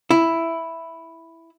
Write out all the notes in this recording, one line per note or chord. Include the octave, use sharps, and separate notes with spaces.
E4